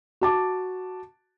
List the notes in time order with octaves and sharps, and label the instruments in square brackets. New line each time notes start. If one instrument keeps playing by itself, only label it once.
[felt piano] F#4 A5 D6